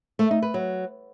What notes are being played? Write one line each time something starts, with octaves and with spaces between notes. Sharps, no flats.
A3
D#4
B4
F#3